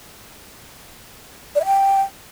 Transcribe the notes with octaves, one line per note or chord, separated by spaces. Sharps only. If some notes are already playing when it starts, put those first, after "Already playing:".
D5
E5
G5